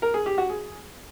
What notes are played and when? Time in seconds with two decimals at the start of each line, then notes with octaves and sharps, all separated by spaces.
0.02 A#4
0.14 G#4
0.26 G4
0.38 F#4
0.50 G#4